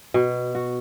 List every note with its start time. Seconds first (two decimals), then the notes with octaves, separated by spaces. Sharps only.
0.14 B2
0.55 F#4